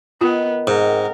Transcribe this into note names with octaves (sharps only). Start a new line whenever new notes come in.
D#3 B3 F4
G#2 C3 A#4 D#5 F#5